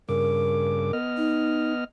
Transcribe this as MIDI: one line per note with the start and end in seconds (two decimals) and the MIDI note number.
0.09 0.92 43
0.09 0.92 49
0.09 0.96 70
0.09 0.92 86
0.93 1.84 59
0.93 1.84 75
0.93 1.84 89
1.17 1.73 63